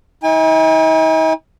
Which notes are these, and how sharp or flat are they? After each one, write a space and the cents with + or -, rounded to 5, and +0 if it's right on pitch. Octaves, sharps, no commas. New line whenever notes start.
D#4 +45 G#5 -40